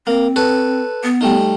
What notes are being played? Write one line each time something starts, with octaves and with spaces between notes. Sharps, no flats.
A#3 C4
A4 B4 C#5
B3
G3 A3 D#4